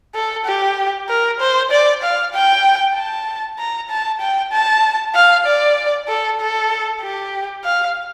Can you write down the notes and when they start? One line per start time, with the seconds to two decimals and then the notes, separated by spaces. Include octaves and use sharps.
0.15 A4
0.45 G4
1.09 A#4
1.40 C5
1.71 D5
2.03 F5
2.34 G5
2.95 A5
3.59 A#5
3.90 A5
4.20 G5
4.52 A5
5.15 F5
5.46 D5
6.08 A4
6.40 A4
7.02 G4
7.65 F5